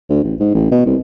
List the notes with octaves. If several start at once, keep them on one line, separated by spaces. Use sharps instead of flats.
D2
A1
G#2
A1
B2
C2